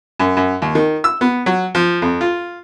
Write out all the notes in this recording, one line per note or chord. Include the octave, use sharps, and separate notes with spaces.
F#2
F#2
D#2
D#3
E6
B3
F#3
F3
F2
F4